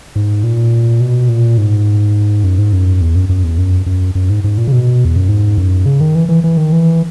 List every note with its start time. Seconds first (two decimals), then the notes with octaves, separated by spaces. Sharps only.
0.16 G#2
0.44 A#2
1.00 B2
1.29 A#2
1.58 G#2
2.44 F#2
2.58 G#2
2.73 F#2
3.01 E2
3.16 F#2
3.29 F#2
3.44 E2
3.58 F#2
3.86 F#2
4.15 F#2
4.30 G#2
4.44 G#2
4.58 A#2
4.67 C#3
4.72 B2
5.05 E2
5.16 F#2
5.29 G#2
5.58 F#2
5.86 C#3
6.01 D#3
6.15 E3
6.29 E3
6.44 E3
6.57 D#3
6.72 E3